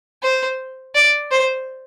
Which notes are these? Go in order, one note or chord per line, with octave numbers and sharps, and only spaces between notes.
C5
D5
C5